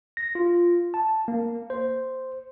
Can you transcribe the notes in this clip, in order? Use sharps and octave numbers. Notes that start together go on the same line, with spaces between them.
A#6
F4
A5
A#3
C5